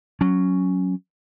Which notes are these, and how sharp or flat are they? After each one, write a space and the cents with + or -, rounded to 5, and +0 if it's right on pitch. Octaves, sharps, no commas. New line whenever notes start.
F#3 +0 C#4 +0